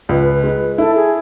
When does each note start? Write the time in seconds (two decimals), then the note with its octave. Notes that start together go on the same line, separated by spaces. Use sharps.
0.09 C#2 B4
0.44 G#3
0.78 E4 A4
0.96 G#4